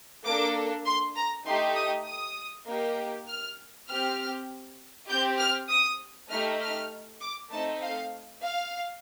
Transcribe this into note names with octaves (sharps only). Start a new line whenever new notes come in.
A#3 D4 A4 D6
C6
A#5
A3 D#4 G4 C6
D#6
D#6
A#3 D#4 G4
F6
C4 G4 F6
C4 G4 G6
F6
D#6
A3 D#4 G4 F6
F6
D6
A3 C4 D#4 A4 A5
F5
F5